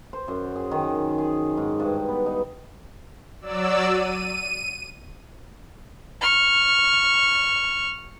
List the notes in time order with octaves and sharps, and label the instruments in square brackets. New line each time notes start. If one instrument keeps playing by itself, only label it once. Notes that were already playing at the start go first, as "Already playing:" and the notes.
[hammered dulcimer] C5
F#2
G#4
D#3
G#4
G#2
G2
B3
D#4
[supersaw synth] F#3 D5 E6
D#7
[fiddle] C#6 F6